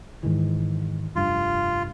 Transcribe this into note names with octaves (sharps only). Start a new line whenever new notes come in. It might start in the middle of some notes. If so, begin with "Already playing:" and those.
G#2 D#3 E3
F1 G2 F4